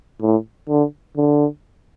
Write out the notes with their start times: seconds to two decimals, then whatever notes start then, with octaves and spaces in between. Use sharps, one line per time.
0.21 A2
0.69 D3
1.17 D3